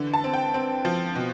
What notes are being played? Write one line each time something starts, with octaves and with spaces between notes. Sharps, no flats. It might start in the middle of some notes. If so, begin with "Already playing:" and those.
Already playing: D3 E3
A5
C4
G5
C4
F3
B2